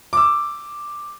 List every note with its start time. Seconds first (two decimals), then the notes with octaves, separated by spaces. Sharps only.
0.13 D6 E6